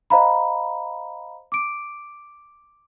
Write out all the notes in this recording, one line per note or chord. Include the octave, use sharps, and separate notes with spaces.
C5 D#5 F5 A#5 B5
D6 D7